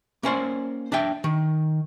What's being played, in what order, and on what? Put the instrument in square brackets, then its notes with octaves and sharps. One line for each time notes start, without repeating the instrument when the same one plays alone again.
[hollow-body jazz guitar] A#3 C#4 C5 D5
D4 D5 E5 G5
D#3